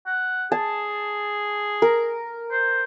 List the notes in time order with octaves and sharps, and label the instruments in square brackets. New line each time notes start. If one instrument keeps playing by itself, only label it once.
[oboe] F#5
[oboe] G#4 [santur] A5
[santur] A#4
[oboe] C5